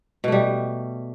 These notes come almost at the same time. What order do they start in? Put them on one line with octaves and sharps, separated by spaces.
B2 A3 G3